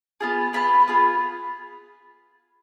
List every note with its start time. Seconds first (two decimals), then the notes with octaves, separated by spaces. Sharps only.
0.21 B3 F4 G#4
0.53 B3 F4 G#4 B5
0.88 B3 F4 G#4